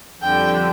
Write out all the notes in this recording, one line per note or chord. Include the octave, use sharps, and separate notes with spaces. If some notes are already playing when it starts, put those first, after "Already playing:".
F2 D3 G3 G5